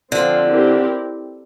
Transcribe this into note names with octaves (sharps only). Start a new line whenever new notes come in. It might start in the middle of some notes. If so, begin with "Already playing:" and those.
D3 F3 C4 F4
C4 E4 G4 A#4